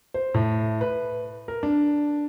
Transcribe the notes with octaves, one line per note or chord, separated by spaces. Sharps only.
C5
A2
B4
A#4
D4